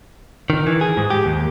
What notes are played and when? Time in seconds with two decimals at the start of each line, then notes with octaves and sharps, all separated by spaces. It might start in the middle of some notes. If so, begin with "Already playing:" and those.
0.50 D#3
0.67 E3
0.81 G#4
0.97 G#2
1.10 G4
1.26 D#2